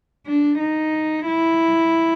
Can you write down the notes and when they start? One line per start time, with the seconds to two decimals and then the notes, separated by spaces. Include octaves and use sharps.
0.27 D4
0.60 D#4
1.27 E4